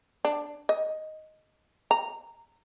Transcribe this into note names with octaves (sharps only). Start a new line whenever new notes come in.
D4
D#5
A#5